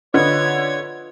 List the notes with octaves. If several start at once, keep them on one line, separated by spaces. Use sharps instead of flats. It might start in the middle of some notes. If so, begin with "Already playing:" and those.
D3 F4 B4 C#5 D#5 G#6